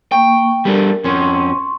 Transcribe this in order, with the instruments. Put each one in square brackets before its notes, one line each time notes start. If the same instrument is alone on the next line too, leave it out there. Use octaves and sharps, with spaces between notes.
[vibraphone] A#3 C#6 [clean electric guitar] G5
[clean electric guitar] G3 A3 D4 [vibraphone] A#4
[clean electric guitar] F2 C#4 [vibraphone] C6 C#6